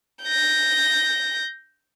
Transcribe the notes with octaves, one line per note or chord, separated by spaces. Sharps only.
G6 A#6